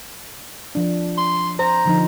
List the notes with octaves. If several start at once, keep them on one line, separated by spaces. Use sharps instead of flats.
F3 D4
C6
C5 A#5
D3 F3 D#4